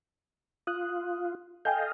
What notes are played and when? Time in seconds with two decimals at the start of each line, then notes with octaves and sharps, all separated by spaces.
0.67 F4 D#6 F#6
1.65 A4 D#5 F5 G5 G#5 G6